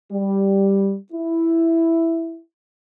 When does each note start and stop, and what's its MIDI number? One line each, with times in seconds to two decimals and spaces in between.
0.11 0.95 55
1.12 2.41 64